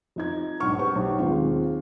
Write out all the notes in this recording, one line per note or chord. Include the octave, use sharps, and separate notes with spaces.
F2 D#4 G#6
B1 G#2 D4 F#5 C#6 F6
G4 B4 C5 C#6
B1
D#2 G#3 C4 F4